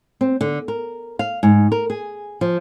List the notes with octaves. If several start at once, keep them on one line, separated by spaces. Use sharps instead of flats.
C4
D3
A#4
F5
G#2
A#4
G#4
F3